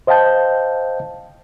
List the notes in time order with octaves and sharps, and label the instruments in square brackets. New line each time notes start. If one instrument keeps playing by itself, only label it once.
[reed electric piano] C5 D#5 F5 G5 A5 G6